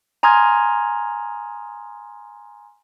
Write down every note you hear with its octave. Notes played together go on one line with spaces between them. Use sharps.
G#5 A#5 C6 D#6 F6 G#6